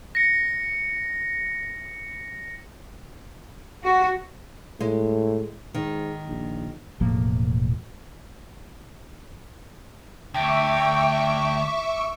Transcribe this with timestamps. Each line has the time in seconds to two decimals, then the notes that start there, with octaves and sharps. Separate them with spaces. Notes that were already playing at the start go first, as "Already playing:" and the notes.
0.15 A#6 C#7
3.83 F#4
4.81 A2 G#3
5.74 G#2 D#3
6.28 A#1
7.00 E1 A2 F3 A#3
10.34 D2 E5 G5 C#6 D6